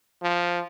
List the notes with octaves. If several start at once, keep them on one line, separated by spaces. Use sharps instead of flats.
F3